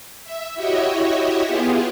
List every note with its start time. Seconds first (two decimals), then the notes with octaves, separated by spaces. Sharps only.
0.24 E5
0.55 E4 F#4 G4 C#5 D#5 E5
1.44 B3 E4 F4 G4 G#4